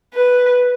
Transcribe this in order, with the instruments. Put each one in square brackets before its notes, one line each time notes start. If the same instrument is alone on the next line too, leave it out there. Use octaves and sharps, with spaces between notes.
[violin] B4